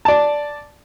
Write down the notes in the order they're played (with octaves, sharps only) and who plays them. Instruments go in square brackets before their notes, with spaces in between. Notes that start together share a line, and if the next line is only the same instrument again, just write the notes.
[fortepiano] D5 A5